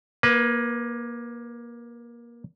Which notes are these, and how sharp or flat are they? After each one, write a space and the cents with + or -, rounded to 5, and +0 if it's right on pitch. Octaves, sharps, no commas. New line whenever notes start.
A#3 +20 B4 +0